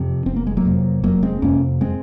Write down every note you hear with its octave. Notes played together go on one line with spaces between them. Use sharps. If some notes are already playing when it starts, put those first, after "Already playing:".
Already playing: F2 C3
F1 C4
A#3
G#3
F#3 A#3
F2 C3
F1 F#3 A#3
G#3 C4
F2 C3 A#3 C#4
G#3 C4